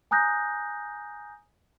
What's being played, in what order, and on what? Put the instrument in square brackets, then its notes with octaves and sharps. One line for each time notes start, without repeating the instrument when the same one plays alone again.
[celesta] G#5 A#5 D#6 F#6 G6 A#6